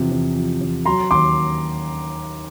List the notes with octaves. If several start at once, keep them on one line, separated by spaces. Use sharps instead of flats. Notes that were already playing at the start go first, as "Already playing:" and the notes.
Already playing: E2 C3 F3
E2
F3
E2
F#3 A#5 C6
D#2 C6 D6